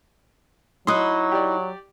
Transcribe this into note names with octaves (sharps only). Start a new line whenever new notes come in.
F#3 D#4 E4 C6 D#6 F#6
G4 D5